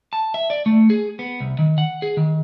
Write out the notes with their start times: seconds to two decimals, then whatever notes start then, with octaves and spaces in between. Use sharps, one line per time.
0.13 A5
0.34 E5
0.50 D5
0.66 A3
0.90 G#4
1.19 B3
1.40 C2
1.59 D#3
1.78 F#5
2.02 G#4
2.17 D#3